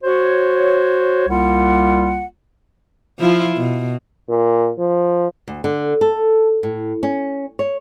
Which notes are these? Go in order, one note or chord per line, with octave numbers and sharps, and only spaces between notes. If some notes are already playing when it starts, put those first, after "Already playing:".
F#4 C5 C#5
C2 G3 A#3 F4 F#5
F3 E4 F4
B2
A#2
F3
D2
D3
A4
A2
C#4
C#5